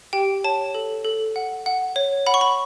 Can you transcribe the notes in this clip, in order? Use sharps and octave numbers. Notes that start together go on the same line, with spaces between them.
G4 G5
C#5 A5
A4
A4
F#5
F#5
C#5
F#5 B5
C#6
B5